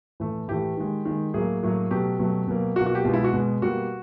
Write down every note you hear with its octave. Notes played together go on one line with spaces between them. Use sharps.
A2 E3 A3
A2 E3 A3 G4
D#3 G#3
D#3 G#3
A2 F#3 A#3 G#4
A2 F#3 A#3
B2 F#3 A3 G4
B2 F#3 A3
B2 F#3 A#3
B2 F#3 A#3 F#4
F#4
G4
B2 G#3 F4
E4
F#4
B2 G#3
B2 G3 A#3 F#4